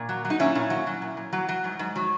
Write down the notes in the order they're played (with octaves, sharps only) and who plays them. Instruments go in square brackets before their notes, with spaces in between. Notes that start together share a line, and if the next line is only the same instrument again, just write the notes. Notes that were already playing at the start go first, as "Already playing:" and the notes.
Already playing: [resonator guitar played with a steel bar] A#2
F#3
F#3
D#4
A#2 C#4 E4
A#2
F#3
F#3
A#2
A#2
F#3
F#3
G#2
G#2
F#3